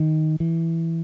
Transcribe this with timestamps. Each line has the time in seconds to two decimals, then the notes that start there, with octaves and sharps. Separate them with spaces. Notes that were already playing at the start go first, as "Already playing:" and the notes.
Already playing: D#3
0.40 E3